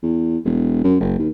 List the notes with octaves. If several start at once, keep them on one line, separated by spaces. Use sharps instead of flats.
E2
E1
F#2
F#1
D#2